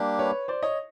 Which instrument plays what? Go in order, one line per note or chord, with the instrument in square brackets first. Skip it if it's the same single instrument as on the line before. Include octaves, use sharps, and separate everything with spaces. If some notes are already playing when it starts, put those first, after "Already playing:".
Already playing: [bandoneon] G3 A#3 D4 G4
[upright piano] B4 C#5
C5 D5
C#5 D#5